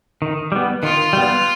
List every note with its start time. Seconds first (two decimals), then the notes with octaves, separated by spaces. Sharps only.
0.22 D#3
0.52 G3 B3
0.83 D#3 F4
1.13 G3 B3